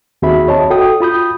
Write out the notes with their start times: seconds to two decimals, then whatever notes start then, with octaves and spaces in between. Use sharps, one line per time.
0.22 D#2 C4 F#4 G#4 E5 B5
0.48 C#5 D#5 A5
0.70 F#4 A4 G5 D#6
1.01 F4 B5 D#6 G6